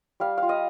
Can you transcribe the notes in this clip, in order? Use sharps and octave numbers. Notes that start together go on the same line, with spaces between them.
G3 F5
F4 F5
D#5